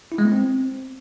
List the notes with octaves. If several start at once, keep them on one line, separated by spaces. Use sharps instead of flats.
E4
G#3
B3
C4